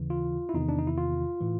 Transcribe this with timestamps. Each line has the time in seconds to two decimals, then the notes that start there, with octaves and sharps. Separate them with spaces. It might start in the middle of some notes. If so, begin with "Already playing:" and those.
Already playing: D#2 C#3 E3
0.10 F4
0.49 E4
0.54 E2 C3 D#3 D#4
0.69 D4
0.79 D#4
0.87 E4
0.98 F4
1.40 A2 E3